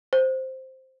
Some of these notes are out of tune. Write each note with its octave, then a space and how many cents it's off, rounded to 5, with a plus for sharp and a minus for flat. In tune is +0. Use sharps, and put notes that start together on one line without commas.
C5 +0